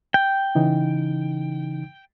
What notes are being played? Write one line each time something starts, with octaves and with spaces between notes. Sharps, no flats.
G5
C#3 E3 D#4